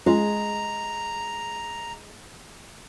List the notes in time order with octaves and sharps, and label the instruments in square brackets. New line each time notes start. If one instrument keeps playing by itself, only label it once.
[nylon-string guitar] G#3 [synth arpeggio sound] C#4 F4 [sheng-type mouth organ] A#5